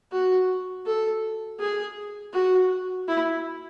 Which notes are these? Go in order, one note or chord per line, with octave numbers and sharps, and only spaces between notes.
F#4
A4
G#4
F#4
E4